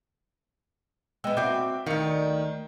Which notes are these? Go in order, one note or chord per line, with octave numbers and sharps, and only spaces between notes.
G#3 B3 D#5 G5 E6
C4 F#4 E5 D6 G6
D2 D#3 F5 C#7